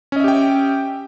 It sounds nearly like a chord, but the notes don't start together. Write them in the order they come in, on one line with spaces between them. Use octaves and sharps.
C#4 D#5 E5 G4 G5